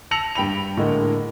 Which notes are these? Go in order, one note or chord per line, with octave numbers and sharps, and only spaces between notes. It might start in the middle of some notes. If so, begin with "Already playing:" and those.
A5 E6 A#6 C#7 F7 F#7
G2 G5 B5 F7
A2 D3 G#3 A#3